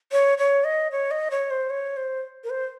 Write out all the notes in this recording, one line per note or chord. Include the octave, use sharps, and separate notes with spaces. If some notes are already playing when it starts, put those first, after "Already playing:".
C#5
C#5
D#5
C#5
D#5
C#5
C5
C#5
C5
A#4
C5